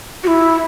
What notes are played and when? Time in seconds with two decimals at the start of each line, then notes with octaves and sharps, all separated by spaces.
0.23 F#4
0.27 E4